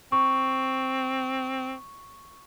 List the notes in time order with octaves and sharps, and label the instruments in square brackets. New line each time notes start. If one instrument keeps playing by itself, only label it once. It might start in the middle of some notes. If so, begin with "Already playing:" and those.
[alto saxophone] C4 [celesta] C#6